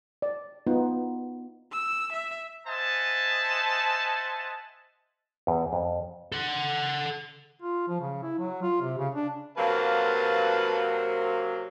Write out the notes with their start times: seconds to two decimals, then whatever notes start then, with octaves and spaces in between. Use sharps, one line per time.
0.22 D5
0.67 B3 D#4 F4
1.72 E6
2.13 E5
2.67 C5 D#5 E5 F#5 G#5 A5
5.47 E2
5.73 F2
6.32 A4 F#5
7.62 F4
7.88 F3
8.01 C#3
8.23 E4
8.39 F#3
8.63 F4
8.82 C3
8.98 C#3
9.15 D4
9.57 C3 F#3 A#3 B4 F5 A5